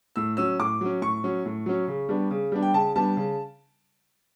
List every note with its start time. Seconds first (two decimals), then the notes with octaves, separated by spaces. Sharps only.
0.16 A2 E6
0.37 F#3 C#4 E6
0.59 A2 D6
0.81 F#3 C#4
1.02 A2 C#6
1.24 F#3 C#4
1.46 A2
1.66 F#3 C#4
1.88 C#3
2.09 G3 B3 D4
2.31 C#3
2.52 G3 B3 D4
2.63 G5
2.74 C#3 A5
2.96 G3 B3 D4 A5
3.17 C#3